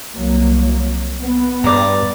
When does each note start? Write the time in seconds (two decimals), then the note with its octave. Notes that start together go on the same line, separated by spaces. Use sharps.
0.15 C2 F#3 A#3
1.22 B3
1.64 G2 D5 A#5